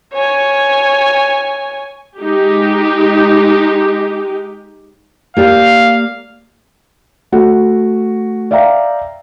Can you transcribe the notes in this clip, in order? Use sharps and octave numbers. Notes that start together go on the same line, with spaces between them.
C#5 G#5
G#3 D#4 G4
A#3 G4 D5 F5
A3 F#4
D5 E5 F5 G5 A#5